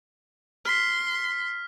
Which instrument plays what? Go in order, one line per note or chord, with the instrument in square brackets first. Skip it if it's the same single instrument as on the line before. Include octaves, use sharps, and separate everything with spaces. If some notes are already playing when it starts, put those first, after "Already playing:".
[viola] C6 [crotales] F6 B6